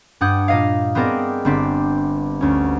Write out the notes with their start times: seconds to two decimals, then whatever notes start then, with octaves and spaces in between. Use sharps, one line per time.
0.21 G2 D4 F#5 D#6 G6 G#6
0.48 A#2 D#5 F5
0.95 B3 C4 G#4 A#4 D5 D#5
1.45 G1 C4 D4 B6
2.41 D2 C#4